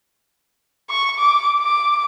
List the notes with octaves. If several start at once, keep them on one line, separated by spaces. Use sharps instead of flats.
C#6
D6
D6